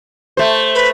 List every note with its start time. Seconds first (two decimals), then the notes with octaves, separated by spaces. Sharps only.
0.37 A3 C5
0.75 B4